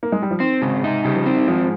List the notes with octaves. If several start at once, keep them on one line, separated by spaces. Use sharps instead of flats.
A#3
G#3
G3
F3
D#3 C4
G#2 C#3
C3 D#4
C#3 G3
F3
D#3 C4
D#3
G#2 F3